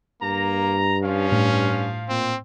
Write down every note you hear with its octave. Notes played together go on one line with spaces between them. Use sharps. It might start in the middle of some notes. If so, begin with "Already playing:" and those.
G2 A#3 A#5
F3 C#4 F5
A2
A#2 C4